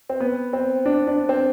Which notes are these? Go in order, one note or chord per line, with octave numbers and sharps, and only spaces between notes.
C4
B3
C4
D4
D4
C4